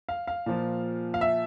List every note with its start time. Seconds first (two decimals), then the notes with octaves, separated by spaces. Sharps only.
0.09 F5
0.27 F5
0.46 A#2 F3
1.14 F5
1.21 E5